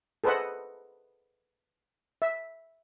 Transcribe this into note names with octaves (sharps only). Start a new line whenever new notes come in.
G#4 A4 B4 C5 D#5 F#5
E5